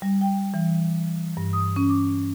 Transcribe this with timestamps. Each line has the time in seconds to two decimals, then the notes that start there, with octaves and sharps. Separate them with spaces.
0.02 G3
0.21 G5
0.54 E3
1.37 G2
1.53 D#6
1.76 C#4
1.89 D6